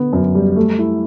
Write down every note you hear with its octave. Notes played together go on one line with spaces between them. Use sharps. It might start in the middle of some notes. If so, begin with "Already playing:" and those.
Already playing: D3 B3
F#2
G3
A3
E4